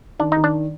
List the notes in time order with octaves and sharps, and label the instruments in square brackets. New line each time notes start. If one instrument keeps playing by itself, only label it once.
[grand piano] D#3 [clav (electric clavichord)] D4
[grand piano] D#3 [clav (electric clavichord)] D#4
[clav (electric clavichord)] D4